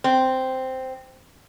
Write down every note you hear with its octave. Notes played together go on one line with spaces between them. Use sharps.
C4